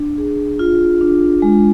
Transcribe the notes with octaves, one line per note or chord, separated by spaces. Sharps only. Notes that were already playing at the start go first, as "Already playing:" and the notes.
Already playing: D4
G#4
F4
D4
G#3